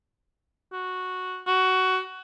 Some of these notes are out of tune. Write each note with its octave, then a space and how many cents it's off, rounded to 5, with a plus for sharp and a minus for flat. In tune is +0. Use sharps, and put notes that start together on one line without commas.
F#4 -5
F#4 +15